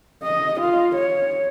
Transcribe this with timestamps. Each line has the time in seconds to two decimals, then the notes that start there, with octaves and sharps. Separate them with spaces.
0.23 D#5
0.60 F4
0.95 C#5